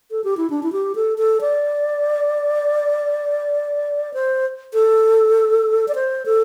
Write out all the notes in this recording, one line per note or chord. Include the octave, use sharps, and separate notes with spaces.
A4
G4
E4
D4
E4
G4
A4
A4
D5
C5
A4
D5
C5
A4